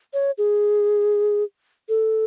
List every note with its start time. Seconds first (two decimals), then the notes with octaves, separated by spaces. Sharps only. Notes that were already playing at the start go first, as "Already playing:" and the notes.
0.13 C#5
0.38 G#4
1.89 A4